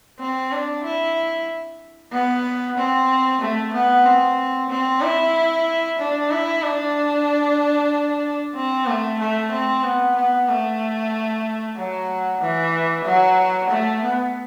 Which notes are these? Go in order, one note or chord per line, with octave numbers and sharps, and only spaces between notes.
C4
D4
E4
B3
C4
A3
B3
C4
C4
E4
D4
E4
D4
C4
A3
A3
C4
B3
B3
A3
F#3
E3
F#3
A3
B3